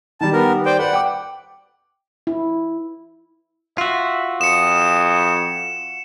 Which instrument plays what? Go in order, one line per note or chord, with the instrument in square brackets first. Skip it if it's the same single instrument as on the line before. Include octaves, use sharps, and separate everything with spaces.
[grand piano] D#3 G3 [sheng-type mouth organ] A5
[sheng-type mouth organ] B3 A#4
C5 D5 G5
[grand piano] B4 D5 [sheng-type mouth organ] F#5
[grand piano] G5 D6
[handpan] E4
[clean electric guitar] F4 F#4 [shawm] E5
[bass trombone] F2 [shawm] D#6 [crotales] C#7 E7